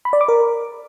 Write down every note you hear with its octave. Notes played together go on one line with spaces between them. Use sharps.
B5
D5
D6
A#4